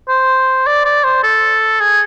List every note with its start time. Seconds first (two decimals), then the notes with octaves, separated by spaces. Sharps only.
0.09 C5
0.67 D5
0.85 D5
1.04 C5
1.24 A4
1.80 G#4